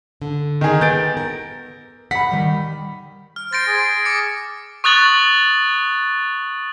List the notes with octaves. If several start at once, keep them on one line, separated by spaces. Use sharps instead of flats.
D3
D#3 G#4
B3 G6 A6 D7
A#4
F#5 B5 B6
D#3 G3
F6
C5 A6 A#6 D7
G#4
D6 C#7
C#6 D#6 F#6 A6 F#7